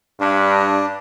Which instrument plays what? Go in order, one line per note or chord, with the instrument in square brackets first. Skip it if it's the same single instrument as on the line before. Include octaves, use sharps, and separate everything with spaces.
[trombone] G2 [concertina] D4